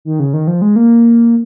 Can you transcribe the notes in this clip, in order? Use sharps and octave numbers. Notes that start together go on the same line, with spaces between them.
D#3
C#3
D#3
F3
G#3
A#3